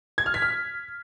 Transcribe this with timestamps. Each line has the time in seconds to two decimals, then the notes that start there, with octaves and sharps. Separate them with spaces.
0.18 G#6
0.26 F6
0.34 B6
0.42 F6